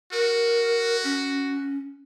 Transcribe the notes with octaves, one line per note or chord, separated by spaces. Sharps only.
F#4 A#4
C#4